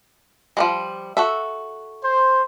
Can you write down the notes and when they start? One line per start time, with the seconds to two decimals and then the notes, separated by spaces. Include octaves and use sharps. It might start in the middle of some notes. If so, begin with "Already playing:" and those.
0.57 F3 G3 G#3
1.17 F#4 A4 E5
2.02 C5